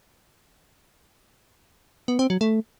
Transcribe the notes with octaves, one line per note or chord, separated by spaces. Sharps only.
B3
C4
F#3
A3